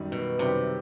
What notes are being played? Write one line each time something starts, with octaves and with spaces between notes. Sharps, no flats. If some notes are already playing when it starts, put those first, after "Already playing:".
Already playing: F#2 D#3 G3
B2
F#2 C3 D#3 G3